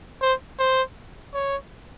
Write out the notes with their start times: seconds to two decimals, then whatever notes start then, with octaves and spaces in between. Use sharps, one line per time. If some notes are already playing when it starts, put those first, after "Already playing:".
0.22 C5
0.59 C5
1.34 C#5